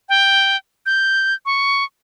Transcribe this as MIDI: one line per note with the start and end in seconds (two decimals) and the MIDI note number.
0.09 0.57 79
0.86 1.34 91
1.46 1.84 85